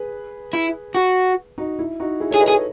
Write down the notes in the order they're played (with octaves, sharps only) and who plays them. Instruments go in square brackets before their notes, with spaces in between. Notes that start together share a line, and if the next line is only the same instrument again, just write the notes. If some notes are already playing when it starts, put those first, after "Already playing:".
Already playing: [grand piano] G#4 B4
[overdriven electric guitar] E4
F#4
[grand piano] D#4 F#4
E4
D#4 F#4
E4 G#4
A4 C#5
[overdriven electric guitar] G#4
[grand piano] B4 D#5
[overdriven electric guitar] G#4
[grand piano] A4 C#5